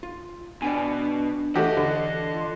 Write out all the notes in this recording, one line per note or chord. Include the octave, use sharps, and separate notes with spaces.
F4
B2 D4 D5 G5 G#5
E3 A3 F#4 G4 D#5
D3
F4